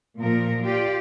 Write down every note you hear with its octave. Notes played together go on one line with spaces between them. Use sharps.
A#2 F3 A#4
F4 G4 D5